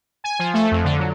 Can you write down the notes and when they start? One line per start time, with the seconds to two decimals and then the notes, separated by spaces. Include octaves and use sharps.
0.24 G#5
0.39 F3
0.54 A3
0.71 F2
0.84 D3
0.99 F#3